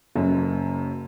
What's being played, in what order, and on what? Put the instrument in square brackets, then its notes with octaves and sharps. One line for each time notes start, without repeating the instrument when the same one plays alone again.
[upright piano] F#1 F#2